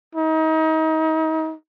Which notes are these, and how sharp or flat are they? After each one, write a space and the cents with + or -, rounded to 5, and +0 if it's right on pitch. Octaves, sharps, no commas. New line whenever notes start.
D#4 +35